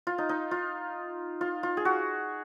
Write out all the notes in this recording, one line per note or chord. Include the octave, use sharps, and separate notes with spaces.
F4
D#4
D#4
F4
F4
F4
G#4
F#4